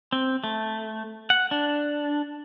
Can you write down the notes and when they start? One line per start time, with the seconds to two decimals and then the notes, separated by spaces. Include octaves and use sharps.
0.12 C4
0.44 A3
1.30 F#5
1.51 D4